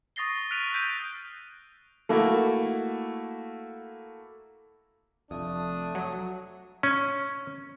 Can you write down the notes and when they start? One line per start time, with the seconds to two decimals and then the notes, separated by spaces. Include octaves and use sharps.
0.16 C#6 D#6 A6 A#6 C7 G7
0.51 F6 F#6 B6 D7 D#7 F7
0.74 E6 G6 B6 D7 D#7 F7
2.09 A3 A#3 E4 F#4
5.31 F1 F2 A3 D4 D#6
5.95 F#3
6.83 C#4